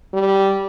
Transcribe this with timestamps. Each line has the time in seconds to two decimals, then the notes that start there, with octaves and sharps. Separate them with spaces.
0.13 G3